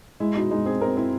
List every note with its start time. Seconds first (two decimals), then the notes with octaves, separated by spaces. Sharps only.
0.20 G#3 E4
0.35 B2 D#4
0.51 G#3 D#4
0.66 C4 G#4
0.81 C4 A#4
0.97 C4 E4